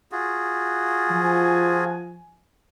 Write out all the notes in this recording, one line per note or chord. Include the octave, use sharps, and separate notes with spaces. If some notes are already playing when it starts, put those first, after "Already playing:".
F4 F#4 G#4
F3 G#5